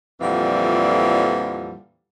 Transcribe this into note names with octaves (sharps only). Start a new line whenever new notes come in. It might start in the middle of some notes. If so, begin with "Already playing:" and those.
F2 A#2 D3 E3 F3 G3